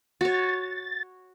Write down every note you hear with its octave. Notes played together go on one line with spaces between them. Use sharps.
F#4 C#5 A6